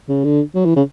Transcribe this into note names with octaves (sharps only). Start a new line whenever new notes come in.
C#3
D3
F#3
E3
C#3